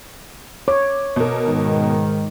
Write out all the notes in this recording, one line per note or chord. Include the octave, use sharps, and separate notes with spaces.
C#5 D6
B2 A#4
G#2 D#3